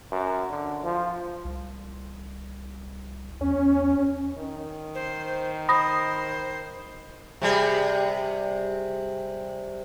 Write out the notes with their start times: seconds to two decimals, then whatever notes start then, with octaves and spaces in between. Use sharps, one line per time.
0.12 F#2
0.50 D3
0.84 F3
1.45 C2
3.41 E2 C#4
4.38 D#3
4.95 C5
5.69 C5 B5 D#6 A#6
7.42 C3 G3 G#4